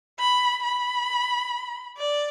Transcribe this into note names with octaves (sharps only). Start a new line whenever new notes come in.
B5
B5
D5